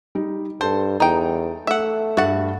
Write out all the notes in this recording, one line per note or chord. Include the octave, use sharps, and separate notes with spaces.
G3 D#4
G2 A4 C5 A5
E2 D#4 G5
A3 E5 F#5
G2 F#4 E5 F#5 A6